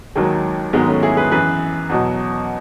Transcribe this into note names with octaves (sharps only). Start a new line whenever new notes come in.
D#2 D#3 F#3 G#3
G#2 D#3 F#3 G#3 B3
A3 C#4
E4 G#4
G#4 B4
F#2 E3 G#4 B4
E2 B2 F#3